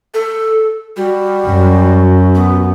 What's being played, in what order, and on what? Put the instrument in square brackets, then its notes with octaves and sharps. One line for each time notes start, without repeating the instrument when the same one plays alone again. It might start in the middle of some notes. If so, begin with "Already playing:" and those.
[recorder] A4
[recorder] G3 [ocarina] F#4
[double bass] F#2
[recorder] B3